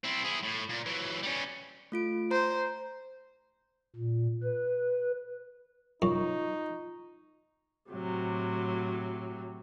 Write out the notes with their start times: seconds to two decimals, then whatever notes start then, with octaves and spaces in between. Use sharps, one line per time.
0.04 C4 E4
0.25 E4 G#4
0.44 A2
0.70 A#2
0.86 E3 F#3
1.23 G3 C#4
1.92 A3 F4 D7
2.31 C5 A#5
3.96 A#2
4.43 B4
6.02 F#2 D#4 F4 C#6
7.91 A2 C3 F#3